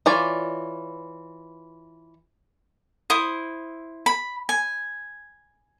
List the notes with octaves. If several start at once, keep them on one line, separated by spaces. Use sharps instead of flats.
E3 F4 C#5 D5
E4 C5 D#6
B5
G#5